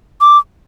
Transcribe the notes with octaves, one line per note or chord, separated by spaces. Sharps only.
D6